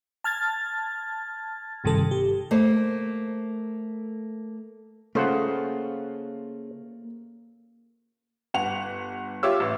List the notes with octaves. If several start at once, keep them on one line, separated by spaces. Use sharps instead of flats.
A5 F6 G#6 A6
G#1 G2 C3 D#3 A4
G4
A3 A#3 C5
C#3 A3 A#3 F4 C5 F#5
G1 F#5 F7
F4 G4 C#5 E5 D6 E6
A1